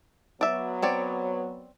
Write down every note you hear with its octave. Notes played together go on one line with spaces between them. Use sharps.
F#3 B3 D5 E5
C4 C#5 D5